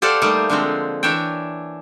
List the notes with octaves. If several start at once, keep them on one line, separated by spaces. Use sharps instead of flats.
G4 A4 C5 D5 F5 F#5
G3 A3 A#3 D#4 G4
D3 F3 G#3 C4
E3 D4 C#5 E5 G5